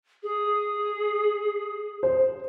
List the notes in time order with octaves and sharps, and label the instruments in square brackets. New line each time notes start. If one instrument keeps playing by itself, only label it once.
[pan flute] G#4
[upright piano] C5